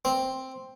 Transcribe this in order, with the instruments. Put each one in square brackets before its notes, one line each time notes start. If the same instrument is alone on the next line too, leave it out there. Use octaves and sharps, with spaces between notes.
[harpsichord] C4